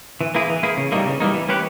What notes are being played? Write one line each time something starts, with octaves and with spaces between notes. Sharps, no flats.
E3
A#3 E4 G#4
E3
A#3 E4 G#4
C#3
E3 G3 A#3 D#4
C#3
E3 G3 A#3 D#4
E3
A#3 C#4 G4 B4